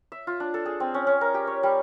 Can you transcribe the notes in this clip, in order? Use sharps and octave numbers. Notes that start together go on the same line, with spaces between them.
E5
F4
D4
A4
G#4
C4
C#4
C#4
A#4
G4
C#5
G3